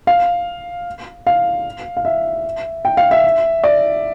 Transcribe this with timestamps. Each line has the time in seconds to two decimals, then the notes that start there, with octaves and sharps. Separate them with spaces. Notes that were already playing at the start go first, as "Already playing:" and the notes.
0.07 F5
1.27 F5
1.97 F5
2.05 E5
2.85 G5
2.97 F5
3.11 E5
3.64 D5